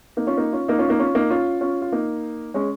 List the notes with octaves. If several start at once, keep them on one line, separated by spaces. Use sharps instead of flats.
A#3 D#4
C#4 F4
A#3 D#4
C#4 F4
A#3 D#4
C#4 F4
A#3 D#4
C#4 F4
A#3 D#4
C#4 F4
C#4 F4
F4
A#3 D#4
G#3 C#4